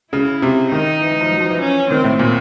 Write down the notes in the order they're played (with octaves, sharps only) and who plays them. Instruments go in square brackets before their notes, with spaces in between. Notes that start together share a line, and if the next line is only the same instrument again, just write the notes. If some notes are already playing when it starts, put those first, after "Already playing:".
[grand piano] C#3 [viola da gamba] E4
[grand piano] C3
[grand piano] D#3 [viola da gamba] D#4
[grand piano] E3
E3
F3
F#3
F3
E3
[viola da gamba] C#4
[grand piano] D#3 [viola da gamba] C4
[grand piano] A2
A#2